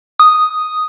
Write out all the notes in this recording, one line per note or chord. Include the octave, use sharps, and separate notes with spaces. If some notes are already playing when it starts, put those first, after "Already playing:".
D#6